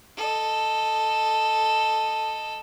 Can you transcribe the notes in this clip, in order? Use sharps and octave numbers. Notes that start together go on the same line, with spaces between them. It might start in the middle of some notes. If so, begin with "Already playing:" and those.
A4 D#5